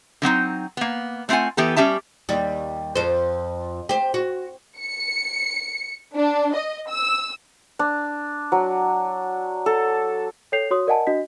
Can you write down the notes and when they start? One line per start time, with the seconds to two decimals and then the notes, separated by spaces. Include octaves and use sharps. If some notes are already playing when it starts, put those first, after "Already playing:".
0.22 D3 F#3 C4 D#4
0.77 A#3 B3
1.29 A3 C4 F4 F#5 G#5
1.57 E3 B3 G4 A4
1.76 G3 C#4 G4 E5 A5
2.29 D#2 G3
2.95 F2 C5
3.89 G4 C5
4.14 F#4
4.79 C#7
6.16 D4
6.54 D#5
6.89 E6
7.79 D4
8.52 F#3
9.66 A4
10.52 A4 C#5 G5 G6 C7 F7
10.71 F#4 C#5 C6 D#6
10.87 A#4 D5 D#5 F#5 G#5 A5
11.07 D4 F#4 D#5 B6